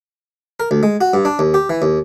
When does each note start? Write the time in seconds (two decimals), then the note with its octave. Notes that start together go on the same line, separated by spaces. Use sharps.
0.60 A#4
0.71 D2
0.83 G#3
1.01 F#4
1.14 G2
1.25 D4
1.39 D#2
1.54 G4
1.70 E3
1.82 D#2